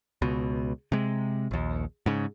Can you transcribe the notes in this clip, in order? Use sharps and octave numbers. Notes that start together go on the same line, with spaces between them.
C#2 B2
C3 G#3
A#1 D#2
G#2 C#3